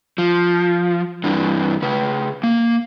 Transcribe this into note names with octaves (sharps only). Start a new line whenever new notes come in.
F3
G2 E3 D4
C#3 B4
A#3